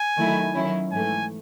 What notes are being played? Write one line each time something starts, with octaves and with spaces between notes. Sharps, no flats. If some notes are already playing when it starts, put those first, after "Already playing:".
Already playing: G#5
D#3 F#3 A3 E4
D#3 F#3 C#4 E4
G#2 E3 A3 G#5